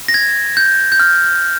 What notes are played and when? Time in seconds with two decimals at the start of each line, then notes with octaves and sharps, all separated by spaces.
0.08 A#6
0.14 G#6
0.57 G6
0.92 G6
1.00 F6